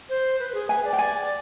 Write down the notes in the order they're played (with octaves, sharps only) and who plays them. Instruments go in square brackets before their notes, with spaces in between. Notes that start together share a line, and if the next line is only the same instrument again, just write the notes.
[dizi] C5
B4
B4
G#4
[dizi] B4 [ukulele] G#5
[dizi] D5
[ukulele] G5
G#5